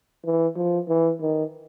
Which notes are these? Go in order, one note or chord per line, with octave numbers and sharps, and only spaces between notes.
E3
F3
E3
D#3